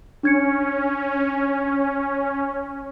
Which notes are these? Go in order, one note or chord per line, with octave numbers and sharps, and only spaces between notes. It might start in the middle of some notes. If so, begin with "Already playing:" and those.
C#4 D4 G#6 C#7